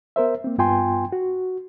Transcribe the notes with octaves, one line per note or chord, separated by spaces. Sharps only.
B3 A#4 C5 E5
A#3 C4
G2 B3 F4 G5 G#5 C6
F#4